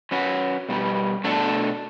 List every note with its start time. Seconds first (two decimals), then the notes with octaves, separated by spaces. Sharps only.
0.11 F#3 C#4 F#4 B4
0.69 B2 G3 B3
1.24 B2 A3 D4 A4